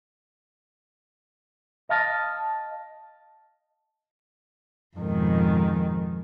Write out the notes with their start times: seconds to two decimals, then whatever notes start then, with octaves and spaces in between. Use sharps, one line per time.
1.89 D#5 F5 A5
4.97 F2 G#2 B2 D#3